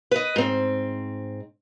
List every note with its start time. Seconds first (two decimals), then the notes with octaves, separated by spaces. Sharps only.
0.11 B4 D#5
0.36 G#2 C4